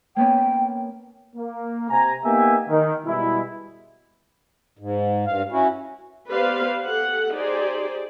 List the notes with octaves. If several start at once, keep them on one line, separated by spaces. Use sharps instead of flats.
A#3 B3 C#4 G5
A#3
C3 G#5 A#5
A#3 B3 D#4 G4 E5 G#5
D#3
B2 G3 G#3 E4
G#2
G2 F5
C#4 E4 F#4
B3 G4 B4 C5 D5 F5
G4 A4 F#5
D#4 G4 G#4 C5 D5